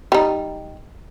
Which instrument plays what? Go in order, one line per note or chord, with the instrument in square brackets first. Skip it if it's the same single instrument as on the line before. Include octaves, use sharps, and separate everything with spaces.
[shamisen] G3 D#4